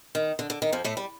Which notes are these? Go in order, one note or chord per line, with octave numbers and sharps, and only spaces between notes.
D#3
D3
D3
D#3
F2 F3
A2 A3
G3